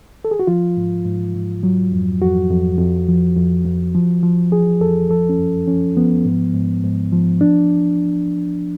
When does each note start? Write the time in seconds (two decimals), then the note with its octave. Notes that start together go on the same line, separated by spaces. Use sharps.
0.25 A4
0.31 G#4
0.40 F#4
0.47 F3 F4
0.77 G#2
1.05 G#2
1.35 G#2
1.63 F#3
1.92 F2
2.21 F2 F#4
2.50 F2
2.78 F2
3.08 F3
3.37 F2
3.65 F2
3.95 F3
4.23 F3
4.52 F3 G#4
4.81 F2 A4
5.10 F3 A4
5.29 C#4
5.39 F#2
5.67 F3 C#4
5.97 F3 B3
6.25 G#2
6.54 G#2
6.84 G#2
7.13 F3
7.41 D4